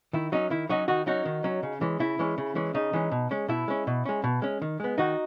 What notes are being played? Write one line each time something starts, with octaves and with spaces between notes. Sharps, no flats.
D#3 E4
F#3 C#4 D#4
D#3 E4
F#3 C#4 D#4 F#4
D#3 D#4 F#4
F#3 C#4 D#4 F#4
D#3
F#3 C#4
C#3
E3 G#3 C#4
C#3 E4
E3 G#3 C#4
C#3
E3 G#3 C#4
C#3 D#4
E3 G#3 C#4
B2
G#3 C#4
B2 E4
G#3 C#4
B2
G#3 C#4
B2
G#3 C#4
D#3
G#3 B3
D#3 D#4 F#4